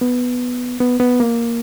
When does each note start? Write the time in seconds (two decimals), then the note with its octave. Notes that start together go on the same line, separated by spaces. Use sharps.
0.01 B3
0.80 B3
1.00 B3
1.20 A#3